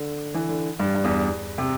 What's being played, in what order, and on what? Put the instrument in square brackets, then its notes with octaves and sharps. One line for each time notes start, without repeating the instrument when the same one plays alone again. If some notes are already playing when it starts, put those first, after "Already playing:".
Already playing: [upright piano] D3
E3
D3
G2
G2
E2
C3